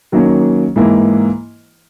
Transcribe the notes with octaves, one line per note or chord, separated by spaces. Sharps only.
D#3 F#3 A#3 C#4
G#2 E3 A#3 E4